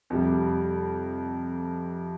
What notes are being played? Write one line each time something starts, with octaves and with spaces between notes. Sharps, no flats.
F2 C3 G3